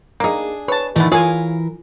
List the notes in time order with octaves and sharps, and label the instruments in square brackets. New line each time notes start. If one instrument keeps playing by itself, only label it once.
[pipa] A#3 D#4 [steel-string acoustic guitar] D4 G#4
[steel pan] B4 [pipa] C#5 A5
[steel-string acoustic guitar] A#2 D#3 E3 [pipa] A3 B3
[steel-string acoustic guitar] E3 A#4 [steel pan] F4 G#5 [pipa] G#4 C#5 F5